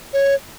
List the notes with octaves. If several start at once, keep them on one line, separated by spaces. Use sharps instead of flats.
C#5